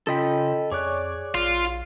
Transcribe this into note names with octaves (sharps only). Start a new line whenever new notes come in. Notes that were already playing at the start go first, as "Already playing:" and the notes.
C#3 C#4 F4 A4 D#5 G5 B5
F2 G#4 C#5 D5 D6 F#6
A#1 F4